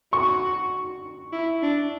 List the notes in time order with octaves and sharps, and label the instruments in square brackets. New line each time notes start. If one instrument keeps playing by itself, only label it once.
[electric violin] F#4 [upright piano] C#6
[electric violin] E4
D4